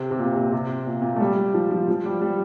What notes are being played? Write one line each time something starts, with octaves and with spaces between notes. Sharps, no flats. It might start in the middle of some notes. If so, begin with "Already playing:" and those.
Already playing: C3
C3
A#2
C3
C3
A#2
A#2
A3
G3
F3
F3
F3
G3
G3